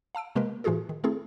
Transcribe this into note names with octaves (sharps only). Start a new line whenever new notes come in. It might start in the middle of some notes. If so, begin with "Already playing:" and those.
F5 A5 E6 D7
C3 G#3 A#3 A#4 B4
A2 E3 F4 F#4 G#4 A4
D#3
A3 C4 E4 G#4 A4